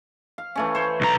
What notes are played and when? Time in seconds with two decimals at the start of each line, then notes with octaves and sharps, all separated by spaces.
0.38 F5
0.55 E3 A3 C#4
0.75 C5 C#5
1.01 B1 A#5